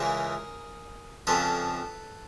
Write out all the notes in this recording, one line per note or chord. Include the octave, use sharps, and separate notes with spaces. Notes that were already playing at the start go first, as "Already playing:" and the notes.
Already playing: C#2 C#3 E3 G#4 A#4
F2 C#3 F3 A4 B4